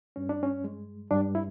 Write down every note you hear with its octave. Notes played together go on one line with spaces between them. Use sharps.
G2 C#4
D4
C#4
G#3
G2 D4
E4